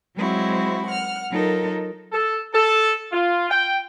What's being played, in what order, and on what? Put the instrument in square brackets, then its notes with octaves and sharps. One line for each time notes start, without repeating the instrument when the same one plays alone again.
[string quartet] F#3 G#3 C4 E4 F#4
F#5 F6
F#3 D#4 F4 A4 A#4
[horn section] A4
A4
F4
G5